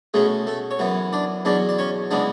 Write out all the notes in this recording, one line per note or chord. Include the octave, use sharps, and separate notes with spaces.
B2 G#3 A3 C#4 G#4
A3 A4
C#5
F#2 E3 B3 B4
D4 D5
E2 B2 F#3 C#4 D4 D5
D5
C#4 C#5
C#3 E3 G#3 B3 D4 D5